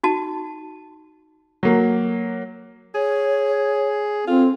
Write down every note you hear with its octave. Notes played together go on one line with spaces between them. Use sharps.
D#4 F#4 A5
F#3 A#3
G#4 C#5
C4 F4 A4